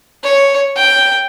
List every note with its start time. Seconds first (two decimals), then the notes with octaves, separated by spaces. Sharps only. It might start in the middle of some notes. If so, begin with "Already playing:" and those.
0.23 C#5
0.76 G5